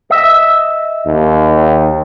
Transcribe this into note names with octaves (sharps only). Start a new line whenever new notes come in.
D#5 E5
D#2